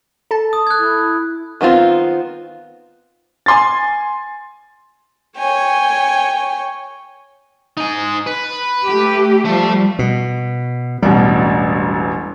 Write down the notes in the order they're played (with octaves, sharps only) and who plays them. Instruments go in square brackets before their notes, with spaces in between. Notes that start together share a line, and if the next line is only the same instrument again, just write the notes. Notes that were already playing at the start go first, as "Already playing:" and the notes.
[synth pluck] A4 A5
[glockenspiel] D#6
F#6 G#6
[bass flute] E4
[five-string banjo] D#3 B3 C4 F4
[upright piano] G#5 C6 A6
[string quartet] C#5 G5 G#5
[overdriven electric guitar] D#4 G#5
B4
[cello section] A3 G4
[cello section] F3 G3 [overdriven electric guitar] A3
[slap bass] B2
[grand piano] E1 A1 B2 [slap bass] G3